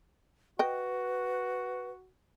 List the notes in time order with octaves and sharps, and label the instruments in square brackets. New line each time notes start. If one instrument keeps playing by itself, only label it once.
[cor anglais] F#4 [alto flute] B4 [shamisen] D#5 G5